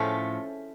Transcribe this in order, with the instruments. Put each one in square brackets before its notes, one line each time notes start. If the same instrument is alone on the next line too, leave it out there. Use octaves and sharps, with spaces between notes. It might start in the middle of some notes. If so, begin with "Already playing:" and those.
Already playing: [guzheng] A2 F3 A3 C#4 F4